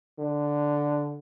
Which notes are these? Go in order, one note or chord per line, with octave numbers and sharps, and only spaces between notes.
D3